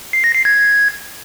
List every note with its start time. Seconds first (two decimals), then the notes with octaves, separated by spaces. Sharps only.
0.13 C7
0.24 A#6
0.35 C7
0.45 G#6